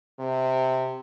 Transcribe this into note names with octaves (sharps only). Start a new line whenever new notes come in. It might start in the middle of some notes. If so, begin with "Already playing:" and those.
C3